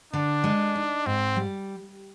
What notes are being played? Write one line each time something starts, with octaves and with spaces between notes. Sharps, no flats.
D3 D4
G#3
D#4
G#2 C4
G3